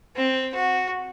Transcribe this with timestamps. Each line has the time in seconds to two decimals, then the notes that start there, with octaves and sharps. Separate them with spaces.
0.16 C4
0.54 F#4